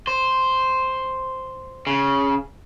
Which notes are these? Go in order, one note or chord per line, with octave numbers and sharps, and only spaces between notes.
C5
C#3